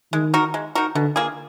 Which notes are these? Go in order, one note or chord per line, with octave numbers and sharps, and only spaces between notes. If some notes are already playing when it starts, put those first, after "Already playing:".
D#3 G#3
D#4 F#4 A#4
G#3
D#4 F#4 A#4
B2 D3
A#3 F4 G#4